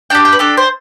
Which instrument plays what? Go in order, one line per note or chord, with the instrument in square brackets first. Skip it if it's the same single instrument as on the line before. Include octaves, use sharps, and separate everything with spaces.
[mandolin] D4 G4 G5
G5
B4
D4 G4 A4
C5